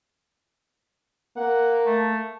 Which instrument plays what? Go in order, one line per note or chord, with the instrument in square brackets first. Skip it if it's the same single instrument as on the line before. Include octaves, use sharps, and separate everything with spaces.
[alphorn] A#3 [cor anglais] F#5
[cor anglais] A3